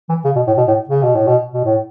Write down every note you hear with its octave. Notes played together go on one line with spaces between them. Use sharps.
E3
C#3
B2
A2
B2
A2
C#3
B2
A2
B2
B2
A2